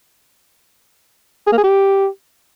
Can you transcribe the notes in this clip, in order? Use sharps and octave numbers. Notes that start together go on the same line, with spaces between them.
G#4
A#3
G#4
G4